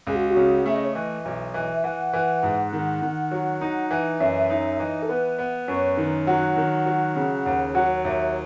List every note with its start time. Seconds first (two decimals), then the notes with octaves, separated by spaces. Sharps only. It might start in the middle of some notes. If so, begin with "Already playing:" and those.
0.07 C#2 G#4
0.15 F#4
0.30 F#4
0.36 C#3
0.65 A3 E5
0.75 D#5
0.85 C#5
0.93 E3 D#5
1.25 B1
1.54 E3
1.74 E5
1.84 E3 F#5
2.14 E3
2.43 G#2
2.73 D#3
3.02 D#3
3.31 F#3
3.61 D#4
3.91 E3
4.20 F#2 E5
4.29 D#5
4.38 E5
4.49 D#4 E5
4.72 E5
4.79 E3 D#5
5.02 A4
5.09 B3 B4
5.39 B3
5.68 F#2 C#5
5.97 D#3
6.27 F#3 F#5
6.57 D#3
6.86 F#3
7.16 C#3
7.46 D#2
7.75 F#3 F#5
8.04 D#2 E5